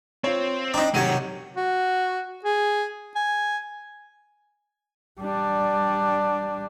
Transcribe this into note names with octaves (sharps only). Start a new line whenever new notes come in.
C4 F4 C#5
D4 D#4 G5 A#5
C3 D#3 F#3 G4 C#5 D#7
F#4
G#4
G#5
G3 D4